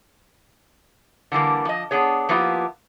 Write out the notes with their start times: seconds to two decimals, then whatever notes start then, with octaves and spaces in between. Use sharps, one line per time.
1.32 D3 E3 G3 A#3
1.65 F3 D#5
1.91 B3 D4 G#4 C#5
2.29 F3 A#3 B3 E4 F4 G4